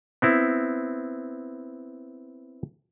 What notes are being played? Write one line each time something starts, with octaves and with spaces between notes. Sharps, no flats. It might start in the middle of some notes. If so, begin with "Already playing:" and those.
B3 C4 E4